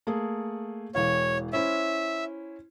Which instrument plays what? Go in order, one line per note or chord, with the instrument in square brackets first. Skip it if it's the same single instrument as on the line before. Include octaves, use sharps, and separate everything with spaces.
[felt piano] A3 A#3 G#4
[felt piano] E1 E3 F5 [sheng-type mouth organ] C#5
[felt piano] C#4 E4 C5 [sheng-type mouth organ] E5